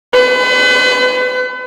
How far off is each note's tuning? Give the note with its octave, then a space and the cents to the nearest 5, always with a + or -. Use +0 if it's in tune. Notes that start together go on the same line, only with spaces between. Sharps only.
B4 +35